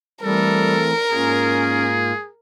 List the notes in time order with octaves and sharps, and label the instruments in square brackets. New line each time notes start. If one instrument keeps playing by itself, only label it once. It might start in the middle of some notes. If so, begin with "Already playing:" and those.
[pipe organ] E3 A3 C4 [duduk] G3 [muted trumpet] A4 [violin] A#4
[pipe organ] G#2 A#3 F4 [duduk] C#4 [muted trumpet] G#4